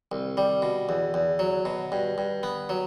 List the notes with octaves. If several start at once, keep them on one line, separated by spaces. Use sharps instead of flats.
C2
G3
B2
E2
E2
F#3
B2
G2
G2
B3
F#3